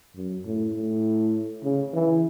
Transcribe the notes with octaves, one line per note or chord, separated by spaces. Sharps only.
F#2
A2
A2
C#3
E3